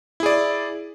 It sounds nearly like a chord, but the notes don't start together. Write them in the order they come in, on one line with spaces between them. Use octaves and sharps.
E4 G#4 D5